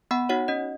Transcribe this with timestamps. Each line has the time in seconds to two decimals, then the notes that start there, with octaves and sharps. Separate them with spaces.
0.11 B3 F#5 B5
0.29 D#4 F#4 C#5 F#5
0.48 C#4 D#5